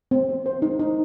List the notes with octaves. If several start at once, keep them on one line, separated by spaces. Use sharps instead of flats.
C4
C5
C5
D#4
D#4